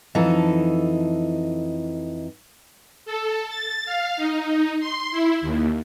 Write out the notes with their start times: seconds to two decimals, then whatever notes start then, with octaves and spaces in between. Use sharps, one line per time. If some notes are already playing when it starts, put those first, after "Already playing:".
0.15 F2 E3 D#4 A4
3.06 A4
3.49 A6
3.86 F5
4.17 D#4
4.80 C6
5.12 E4
5.41 D#2